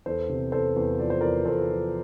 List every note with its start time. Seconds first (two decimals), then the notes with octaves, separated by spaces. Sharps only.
0.06 E2 A4 C5
0.29 C3
0.52 E2 A4 C5
0.76 E2
0.99 F3 D5
1.10 C5
1.21 E2 A#4 D5
1.45 E2 A4 C5
1.69 F3